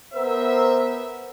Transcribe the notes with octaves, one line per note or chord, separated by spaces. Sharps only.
B3 A#4 C5 E5